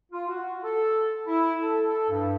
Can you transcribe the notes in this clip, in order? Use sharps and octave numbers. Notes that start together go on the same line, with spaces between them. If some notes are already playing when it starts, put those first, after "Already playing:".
F4
F#4
A4
E4
A4
A4
G2